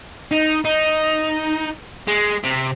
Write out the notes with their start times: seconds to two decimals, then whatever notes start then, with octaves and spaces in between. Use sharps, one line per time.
0.31 D#4
0.65 D#4
2.08 G#3
2.44 C3